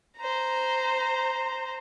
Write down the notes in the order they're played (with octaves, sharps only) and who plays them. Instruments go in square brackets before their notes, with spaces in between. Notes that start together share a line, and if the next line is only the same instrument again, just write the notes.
[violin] C5 A#5